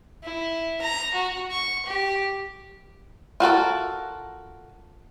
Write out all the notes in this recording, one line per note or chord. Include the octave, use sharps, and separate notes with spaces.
E4
A#5
F#4
C#6
G4
F4 F#4 A4 A#4